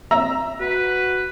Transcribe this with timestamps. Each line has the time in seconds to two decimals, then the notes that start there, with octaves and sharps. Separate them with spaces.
0.11 E5 A#5 E6
0.60 F#4 B4